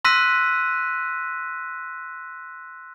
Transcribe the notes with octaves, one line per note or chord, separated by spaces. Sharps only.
C6 E6 F#6 A#6 B6 D#7